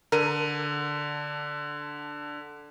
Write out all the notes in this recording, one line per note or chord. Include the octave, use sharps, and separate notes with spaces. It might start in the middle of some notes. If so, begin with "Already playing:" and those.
D3 A#4 D#7